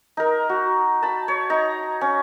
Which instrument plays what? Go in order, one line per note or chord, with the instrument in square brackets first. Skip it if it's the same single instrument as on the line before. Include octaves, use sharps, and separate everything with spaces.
[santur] D#4 A#4
F#4
A5 B5
C#5
D#4 A#5
C#4